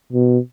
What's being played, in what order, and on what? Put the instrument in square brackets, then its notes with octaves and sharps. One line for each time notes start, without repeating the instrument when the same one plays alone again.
[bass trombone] B2